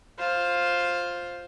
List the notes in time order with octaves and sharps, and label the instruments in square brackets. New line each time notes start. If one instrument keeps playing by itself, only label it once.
[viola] F4 C5